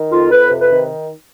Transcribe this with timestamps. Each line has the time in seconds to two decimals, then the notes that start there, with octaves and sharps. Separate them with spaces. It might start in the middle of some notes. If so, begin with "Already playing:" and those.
Already playing: D#3
0.12 F2 F4
0.31 F2 B4
0.50 C3
0.60 B4
0.70 D#3